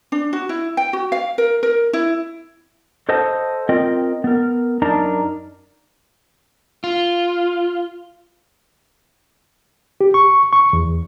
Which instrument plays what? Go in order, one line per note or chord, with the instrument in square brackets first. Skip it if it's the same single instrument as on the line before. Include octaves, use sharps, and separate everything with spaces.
[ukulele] D4
F#4
E4
G5
F#4
F5
A#4
A#4
E4
[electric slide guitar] A4 C5 D#5 F#5 A5
C4 F4 A#4 D#5 G5
B3 A#4
F#2 D4 D#4 A#4 A5 A#5
F4
[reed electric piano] G4
C#6
C#6
E2